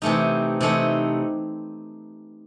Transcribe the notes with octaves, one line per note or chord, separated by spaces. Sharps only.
C3 E3 A3 D#4
C3 E3 A3 D#4